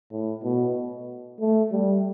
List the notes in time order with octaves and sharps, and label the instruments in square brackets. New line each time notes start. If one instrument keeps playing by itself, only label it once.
[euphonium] A2
B2
A3
G3